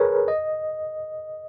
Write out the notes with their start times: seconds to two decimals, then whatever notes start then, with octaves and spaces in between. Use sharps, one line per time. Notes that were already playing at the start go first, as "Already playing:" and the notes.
Already playing: G#4 A#4 B4 C#5
0.28 D#5